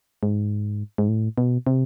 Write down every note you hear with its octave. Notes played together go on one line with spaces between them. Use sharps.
G#2
G#2
A2
B2
C3